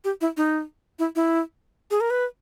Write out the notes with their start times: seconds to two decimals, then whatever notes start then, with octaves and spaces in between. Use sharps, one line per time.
0.04 G4
0.21 E4
0.37 D#4
0.99 E4
1.16 E4
1.91 G#4
2.01 A#4
2.10 B4